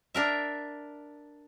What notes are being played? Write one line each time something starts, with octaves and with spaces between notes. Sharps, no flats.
D4 A#4 E5